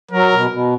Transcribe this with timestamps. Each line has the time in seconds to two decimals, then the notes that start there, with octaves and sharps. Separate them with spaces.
0.11 F#3 A#4
0.32 B2
0.51 B2